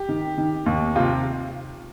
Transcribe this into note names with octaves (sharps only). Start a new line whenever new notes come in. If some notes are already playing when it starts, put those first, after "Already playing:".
Already playing: G4
D#3
D#3
D#2
C3 F4